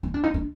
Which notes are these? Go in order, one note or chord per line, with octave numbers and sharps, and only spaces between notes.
D#4
D4
D#4
D4